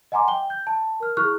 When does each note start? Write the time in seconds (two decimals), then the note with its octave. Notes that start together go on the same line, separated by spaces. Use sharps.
0.12 D#5 F#5 G#5 A#5 C6 D6
0.28 G5 G7
0.50 G6
0.67 A5
1.00 A#4 F6
1.17 E4 G#4 C#6 F6 F#6